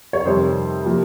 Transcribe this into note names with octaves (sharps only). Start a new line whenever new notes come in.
C#5
F2 C3 D#3 G3 C5
C3 F3 A#3